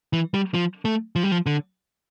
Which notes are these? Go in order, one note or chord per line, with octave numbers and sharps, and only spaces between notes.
E3
G3
F3
A3
F3
G3
F3
D3